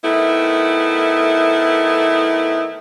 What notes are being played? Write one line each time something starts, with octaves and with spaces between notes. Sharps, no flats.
D#3 A3 B3 E4